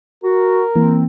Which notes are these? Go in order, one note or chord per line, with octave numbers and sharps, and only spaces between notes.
F#4 A#4
E3 A#3 C4